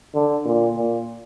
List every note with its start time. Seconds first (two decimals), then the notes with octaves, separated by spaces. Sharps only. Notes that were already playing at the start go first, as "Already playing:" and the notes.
0.14 D3
0.45 A#2
0.76 A#2